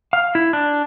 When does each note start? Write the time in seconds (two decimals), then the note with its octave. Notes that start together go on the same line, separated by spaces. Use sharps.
0.13 F5
0.35 E4
0.53 D4